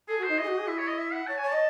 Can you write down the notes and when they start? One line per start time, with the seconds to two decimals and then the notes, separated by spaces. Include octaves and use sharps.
0.08 G#4 A4
0.19 F#4
0.23 C5
0.29 D#4
0.38 E4 D#5
0.43 G#4
0.48 F#4
0.58 G#4
0.68 E4 E5
0.78 C#5
0.88 D#5
0.98 E5
1.13 F#5
1.27 C#5 A5
1.38 G#5
1.43 C#5 A5
1.53 D#5